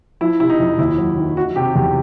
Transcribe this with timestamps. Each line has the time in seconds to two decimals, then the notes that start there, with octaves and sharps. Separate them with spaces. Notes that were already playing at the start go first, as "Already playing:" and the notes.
0.21 F3 E4
0.40 C3 E4
0.50 D#4
0.60 F2
0.78 D#2 E4
0.98 F#3
1.17 D#3
1.37 D#3 F#4
1.56 C3 G4
1.75 E2 G4